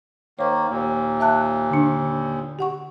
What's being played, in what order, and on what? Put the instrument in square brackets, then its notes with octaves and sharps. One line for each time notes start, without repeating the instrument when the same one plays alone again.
[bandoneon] D#3 A#3 [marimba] C5 C#5
[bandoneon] D#2 A#2
[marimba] E5 A5 F#6
D3 D4
G4 F#5 C#6